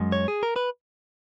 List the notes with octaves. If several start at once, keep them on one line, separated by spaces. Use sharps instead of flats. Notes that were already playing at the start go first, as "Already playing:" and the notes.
Already playing: F#2 G#3
C#5
G#4
A#4
B4